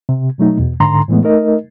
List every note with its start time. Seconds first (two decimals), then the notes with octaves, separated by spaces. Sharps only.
0.09 C3
0.38 B2 F#3 A3 D#4
0.58 E2 B2
0.80 G#2 D3 A#5 C6
1.08 A2 E3 G#3 A3 B3
1.23 A3 D#4 A#4 D#5